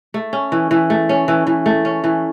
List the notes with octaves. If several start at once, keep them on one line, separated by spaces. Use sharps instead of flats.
A3
C#4
E3
E3
A3
C#4
E3
E3
A3
C#4
E3